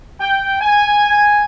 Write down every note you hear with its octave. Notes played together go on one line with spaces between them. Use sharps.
G5
G#5